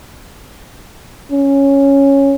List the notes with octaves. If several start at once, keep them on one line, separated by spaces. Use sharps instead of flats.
C#4